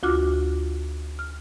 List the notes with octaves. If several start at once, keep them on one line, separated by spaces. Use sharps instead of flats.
D2 F4 F#4 D6 F6
F6